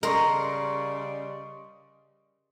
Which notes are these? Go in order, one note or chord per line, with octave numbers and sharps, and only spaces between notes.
C#3 G3 A#4 D5 D#5 C6 C#6